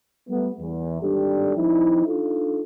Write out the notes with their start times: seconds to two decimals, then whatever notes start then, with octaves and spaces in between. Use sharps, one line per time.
0.30 G3 A3 B3
0.60 E2
1.01 G#1 G3 D4 G4 A4
1.56 F3 C4 D#4 E4
2.05 D4 D#4 F4 A4